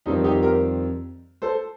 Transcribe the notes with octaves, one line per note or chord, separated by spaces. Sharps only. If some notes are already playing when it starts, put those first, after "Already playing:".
F2 D#3 G3 C4 D#4
D#4 G4
G4 A#4
A4 C5